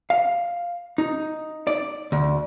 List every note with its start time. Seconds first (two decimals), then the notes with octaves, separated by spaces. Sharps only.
0.10 F5
0.98 D#4
1.67 D5
2.12 D2